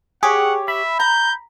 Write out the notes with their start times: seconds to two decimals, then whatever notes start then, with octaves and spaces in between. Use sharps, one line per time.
0.23 G4 G#4 C#5 F#5
0.68 E5 B5
1.00 A#5 G6